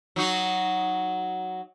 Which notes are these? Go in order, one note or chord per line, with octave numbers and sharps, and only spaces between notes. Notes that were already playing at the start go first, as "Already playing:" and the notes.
F#3 D#4 F#4